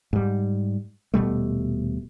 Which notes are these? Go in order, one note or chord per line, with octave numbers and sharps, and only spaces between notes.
G#2 G3
D#1 B2 G3 A3